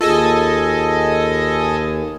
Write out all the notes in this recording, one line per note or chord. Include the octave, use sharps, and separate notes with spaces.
D#2 F4 G#4 A4 D#5 G#5